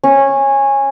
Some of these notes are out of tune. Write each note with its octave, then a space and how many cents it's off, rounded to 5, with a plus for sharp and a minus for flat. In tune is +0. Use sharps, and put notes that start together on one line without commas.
C#4 -15